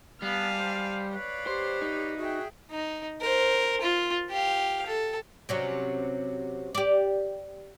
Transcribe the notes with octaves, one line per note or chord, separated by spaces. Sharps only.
G3 B3 F5 G#5 A5
C5
B4 C#5 D5 F5
G4 C5
D#4
F#4 G#4 E5 G5
D#4
A#4 C5
F4
G4 F5
A4
C3 F#3 C#4
G4 D5